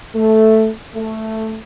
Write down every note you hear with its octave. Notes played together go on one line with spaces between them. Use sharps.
A3
A3